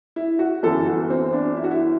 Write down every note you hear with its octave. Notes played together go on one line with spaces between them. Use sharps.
E4
F#4
G1 F#2 E3 A4
F#4
C4
D4
E4
F#4
E4